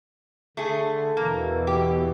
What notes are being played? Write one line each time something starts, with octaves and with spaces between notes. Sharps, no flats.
D3 A3 G#4
E2 B2 E3 A#3
G4